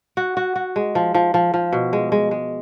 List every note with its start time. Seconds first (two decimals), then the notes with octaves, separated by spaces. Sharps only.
0.17 F#4
0.37 F#4
0.56 F#4
0.76 G#3
0.95 F3
1.14 F3
1.34 F3
1.54 F3
1.73 B2
1.93 G#3
2.12 G#3
2.31 G#3